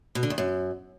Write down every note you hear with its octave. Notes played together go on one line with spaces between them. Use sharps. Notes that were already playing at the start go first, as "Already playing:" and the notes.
B2
D3
E2
F#2